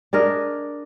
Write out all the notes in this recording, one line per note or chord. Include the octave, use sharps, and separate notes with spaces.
D4 G#4 A#4 D#5